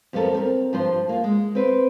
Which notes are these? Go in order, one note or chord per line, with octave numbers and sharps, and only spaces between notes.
F2 G3 B3 D4 A4 A#4
C4 A#4
G2 F3 C5
A#3 F4
G#3
C4 B4 C5